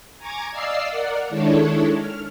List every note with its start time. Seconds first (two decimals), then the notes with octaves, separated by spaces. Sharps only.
0.18 G#5 A#5 C#6 D6 G#6
0.51 D5 D#5 F5 E6 F6 C7
0.88 A#4 D5 F#5
1.29 D#3 G#3 D4 E4 A4 C#5
1.97 F6